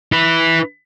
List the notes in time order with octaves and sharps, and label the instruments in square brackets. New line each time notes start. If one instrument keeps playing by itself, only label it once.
[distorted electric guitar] E4 B4